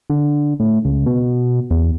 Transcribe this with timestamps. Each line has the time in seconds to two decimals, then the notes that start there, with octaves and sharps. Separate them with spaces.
0.10 D3
0.60 A2
0.85 C#2
1.06 B2
1.71 E2